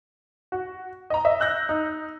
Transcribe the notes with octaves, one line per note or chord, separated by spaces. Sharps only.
F#4
D#5 A#5
D#5 E5
E6 F#6 G6 A#6
D#4